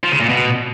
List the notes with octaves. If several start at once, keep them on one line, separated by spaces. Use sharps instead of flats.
F3
C#3
A#2
B2